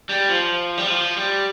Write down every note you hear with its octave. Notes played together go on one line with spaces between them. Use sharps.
G3
F3
G3
F3
G3